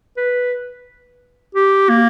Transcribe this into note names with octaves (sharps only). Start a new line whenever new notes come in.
B4
G4
A#3